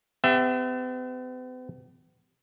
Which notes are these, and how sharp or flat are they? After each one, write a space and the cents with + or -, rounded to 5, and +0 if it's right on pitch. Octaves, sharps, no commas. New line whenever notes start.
B3 +45 G4 +25 E5 +15